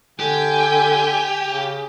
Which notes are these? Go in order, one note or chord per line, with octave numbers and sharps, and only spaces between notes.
D3 G4 G#5 G6
C#3